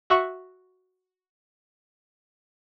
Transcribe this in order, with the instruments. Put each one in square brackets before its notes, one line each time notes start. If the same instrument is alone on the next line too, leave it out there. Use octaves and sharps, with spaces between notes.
[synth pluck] F#4 E5 F#5 C#6